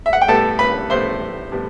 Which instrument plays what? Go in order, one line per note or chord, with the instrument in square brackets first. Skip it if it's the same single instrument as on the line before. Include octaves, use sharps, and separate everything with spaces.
[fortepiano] E5
F#5
G5
A2 G3 B3 A4 A5
B4 B5
A2 G3 B3 C5 C6
A2 G3 B3